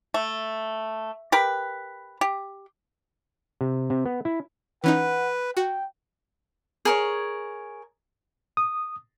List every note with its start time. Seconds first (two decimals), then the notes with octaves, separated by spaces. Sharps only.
0.14 A3
1.32 G4 A#4 B4
2.21 G4
3.61 C3
3.90 C3
4.05 B3
4.25 E4
4.84 E3 C#4 D#4 B4 F#5
5.57 F#4 G5
6.85 G#4 A#4 C#5
8.57 D#6